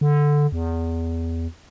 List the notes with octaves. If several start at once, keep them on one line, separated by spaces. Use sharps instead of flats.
D3
E2